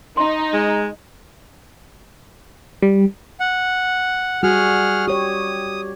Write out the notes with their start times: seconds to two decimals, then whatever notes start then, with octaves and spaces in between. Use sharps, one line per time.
0.17 D#4 C6
0.53 G#3
2.82 G3
3.40 F#5
4.43 G3 F#4 G#4 F#5 F6
5.08 G4 C#5 D#6